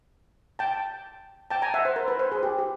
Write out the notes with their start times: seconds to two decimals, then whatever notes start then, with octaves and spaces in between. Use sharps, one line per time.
0.59 G5 A5
1.50 G5 A5
1.62 G#5 A#5
1.74 E5 F#5
1.85 C5
1.96 A#4
2.08 B4
2.19 C5
2.32 G#4
2.43 G4
2.59 G4